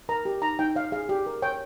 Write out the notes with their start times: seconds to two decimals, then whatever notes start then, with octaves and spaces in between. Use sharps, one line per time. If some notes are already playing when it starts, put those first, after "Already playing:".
0.09 A#4 A#5
0.25 G4
0.42 D#4 A#5
0.59 D#4 G5
0.75 C#5 F5
0.92 G#4 F5
1.09 G4
1.26 A#4
1.42 C#5 G5